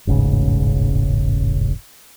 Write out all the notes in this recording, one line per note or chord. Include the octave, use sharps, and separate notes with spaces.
E1 A1 G#2 C#3